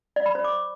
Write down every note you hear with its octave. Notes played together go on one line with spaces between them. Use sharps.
D5
B5
C5
D6